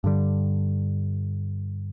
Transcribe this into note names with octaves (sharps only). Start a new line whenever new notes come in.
G2 D3 G3